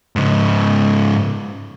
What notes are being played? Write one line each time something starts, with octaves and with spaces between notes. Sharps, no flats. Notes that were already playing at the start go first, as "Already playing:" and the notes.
G#2 C#3